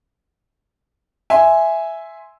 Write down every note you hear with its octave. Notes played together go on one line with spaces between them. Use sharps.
E5 G#5 C6